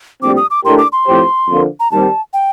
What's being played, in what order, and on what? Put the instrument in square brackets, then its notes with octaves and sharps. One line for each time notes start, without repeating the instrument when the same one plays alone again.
[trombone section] A#1 A2 G3 C4 [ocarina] D6
[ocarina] D#6
D6
[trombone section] A2 A3 D4 G4 A#4 [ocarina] C6
[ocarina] D6
C6
[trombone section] A2 F3 C4 G4 C5
F2 D3 F3 A#3
[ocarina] A#5
[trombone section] D#2 D#3 G3 C4 [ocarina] A5
[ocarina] G5